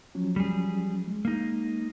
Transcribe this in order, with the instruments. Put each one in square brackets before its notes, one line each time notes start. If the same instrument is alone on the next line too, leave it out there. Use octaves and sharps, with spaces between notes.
[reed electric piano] F3 F#3 C#4
[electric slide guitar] G3 G#4
[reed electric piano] G#3
[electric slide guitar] A#3 D#4